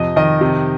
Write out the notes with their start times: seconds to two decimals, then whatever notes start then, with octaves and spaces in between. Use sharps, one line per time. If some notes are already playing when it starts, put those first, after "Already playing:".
Already playing: F2 C3 D#5
0.16 D#3 D#5
0.41 C3